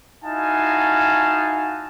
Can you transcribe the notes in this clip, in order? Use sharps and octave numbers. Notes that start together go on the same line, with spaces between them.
D#4 E4 F#4 F5 G#5 A5